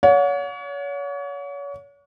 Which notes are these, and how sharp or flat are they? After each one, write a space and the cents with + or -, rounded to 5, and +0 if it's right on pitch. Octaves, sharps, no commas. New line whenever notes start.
C#5 +35 F#5 -40